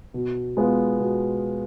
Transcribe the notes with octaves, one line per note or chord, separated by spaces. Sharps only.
B2
G#3 B3 F4
B2